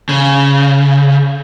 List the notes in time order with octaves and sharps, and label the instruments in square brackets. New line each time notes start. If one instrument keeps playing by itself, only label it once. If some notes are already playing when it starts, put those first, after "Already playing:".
[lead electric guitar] C#3